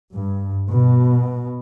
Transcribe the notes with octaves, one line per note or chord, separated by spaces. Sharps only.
G2
B2